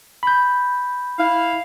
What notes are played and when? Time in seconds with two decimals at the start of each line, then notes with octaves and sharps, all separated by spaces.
0.23 B5 G6
1.19 E4 F5